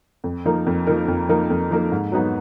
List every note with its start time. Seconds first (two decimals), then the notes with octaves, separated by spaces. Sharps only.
0.24 F2
0.45 F3 A#3 D#4 A#4
0.67 F2
0.87 F3 A#3 D#4 A#4
1.08 F2
1.29 F3 A#3 D#4 A#4
1.50 F2
1.71 F3 A#3 D#4 A#4
1.92 G#2
2.12 F#3 B3 D#4 F#4